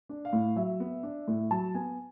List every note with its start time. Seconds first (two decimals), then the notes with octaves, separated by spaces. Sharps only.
0.09 D4
0.25 F5
0.33 A2
0.56 F#3 E5
0.80 B3
1.03 D4
1.28 A2
1.51 F#3 A5
1.74 B3 G#5